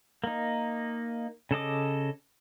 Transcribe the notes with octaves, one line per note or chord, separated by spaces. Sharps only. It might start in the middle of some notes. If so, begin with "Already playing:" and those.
A#3 D#4
C#3 A4 D#5 D6